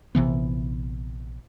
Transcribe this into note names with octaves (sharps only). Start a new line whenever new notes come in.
A#1 C3 E3 B3